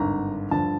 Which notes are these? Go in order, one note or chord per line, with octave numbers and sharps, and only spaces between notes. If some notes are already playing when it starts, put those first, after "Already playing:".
Already playing: G#1 G2 D3 A#5
G2 D3 F3 A5